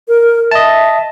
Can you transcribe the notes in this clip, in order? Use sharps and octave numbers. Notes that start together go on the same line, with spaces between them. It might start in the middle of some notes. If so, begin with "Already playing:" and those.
A#4
D#5 E5 A5